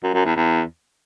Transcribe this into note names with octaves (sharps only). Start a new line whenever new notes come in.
F#2
F#2
E2
E2